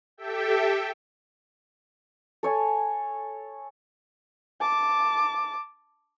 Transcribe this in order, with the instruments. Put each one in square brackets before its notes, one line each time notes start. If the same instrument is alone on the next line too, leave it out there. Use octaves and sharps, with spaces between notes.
[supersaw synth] G4 A4 E5 G5
[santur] A4 C#5 G#5
[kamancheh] A5 D6